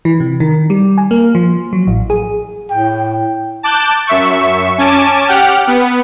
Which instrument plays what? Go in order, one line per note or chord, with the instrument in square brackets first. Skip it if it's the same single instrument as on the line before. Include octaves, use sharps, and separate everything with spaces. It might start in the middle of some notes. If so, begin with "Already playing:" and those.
[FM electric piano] E3
C3
D#3
G3
G#5
A#3
F3
F#3
A1
G#4
[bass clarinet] A2 [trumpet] G5
[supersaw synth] A5 D6 F#6 G6 A6
F#2 E5 C#6
C#4 G#5 A5 D6
G4 F#5 G5 F6
B3